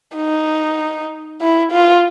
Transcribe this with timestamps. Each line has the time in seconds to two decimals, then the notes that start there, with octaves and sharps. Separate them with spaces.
0.16 D#4
1.41 E4
1.72 F4